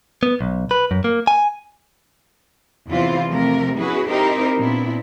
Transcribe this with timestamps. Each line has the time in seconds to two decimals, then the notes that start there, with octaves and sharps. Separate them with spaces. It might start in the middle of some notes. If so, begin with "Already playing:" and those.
0.23 B3
0.41 B1
0.71 B4
0.91 F#2
1.04 A#3
1.27 G#5
2.88 E2 C3 E3 E4 F4 C5
3.28 C3 F3 A3 A#3 C4 A#4
3.77 B3 C#4 E4 F#4 G#4 B4
4.09 C4 D#4 E4 G4 A#4 C5
4.59 A#2 B3 C4 D4 E4